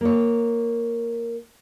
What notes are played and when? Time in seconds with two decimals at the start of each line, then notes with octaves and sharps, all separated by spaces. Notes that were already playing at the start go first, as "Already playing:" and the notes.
0.01 A#3 C#5